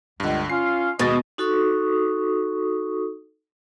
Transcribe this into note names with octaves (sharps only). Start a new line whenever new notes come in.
C#2 G2 D3
C#4 F4 F5 C7
D#2 B2 G#3 D#5 A6
D#4 F#4 A4 C#6 D#6